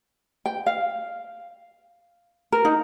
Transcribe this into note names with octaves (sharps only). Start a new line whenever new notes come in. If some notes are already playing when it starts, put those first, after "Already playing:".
G5
F5
A#4
D#4